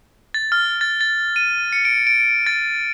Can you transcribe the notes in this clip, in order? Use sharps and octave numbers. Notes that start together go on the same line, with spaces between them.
A6
F6
A6
A6
D#7
C#7
D7
D7
A6